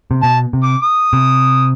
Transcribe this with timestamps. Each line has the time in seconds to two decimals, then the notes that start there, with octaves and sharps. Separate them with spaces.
0.11 C3
0.23 B2 A5
0.53 C3
0.63 D6
0.83 D#6
1.13 C3